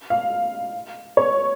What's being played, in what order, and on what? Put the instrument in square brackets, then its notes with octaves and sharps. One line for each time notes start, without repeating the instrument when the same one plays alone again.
[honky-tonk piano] F5
C#5